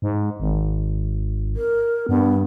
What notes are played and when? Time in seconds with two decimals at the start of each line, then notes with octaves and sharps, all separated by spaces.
0.02 G#2
0.40 G#1
1.56 A#4
2.09 G2 B3